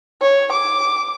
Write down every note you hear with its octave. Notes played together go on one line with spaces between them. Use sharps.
C#5
D6